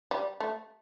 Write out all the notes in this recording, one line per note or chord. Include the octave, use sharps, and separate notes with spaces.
G3
A3